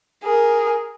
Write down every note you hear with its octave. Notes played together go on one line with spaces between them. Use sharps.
G#4 A#4